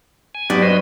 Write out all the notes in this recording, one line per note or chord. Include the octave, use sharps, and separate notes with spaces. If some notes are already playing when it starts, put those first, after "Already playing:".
G#5
G2 F#3 B3 G4 D5
B4 C5 D#5